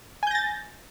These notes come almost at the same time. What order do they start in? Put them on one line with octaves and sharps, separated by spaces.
G#5 G6 A#6 A6